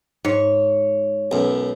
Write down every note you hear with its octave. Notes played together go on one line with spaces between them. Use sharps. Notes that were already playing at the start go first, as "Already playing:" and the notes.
G#2 C#5
B1 F#2